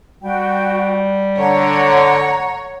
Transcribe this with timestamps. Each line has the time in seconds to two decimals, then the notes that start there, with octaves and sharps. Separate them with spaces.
0.23 G3 F#4 G5
1.38 D3 C#5 F#5 A#5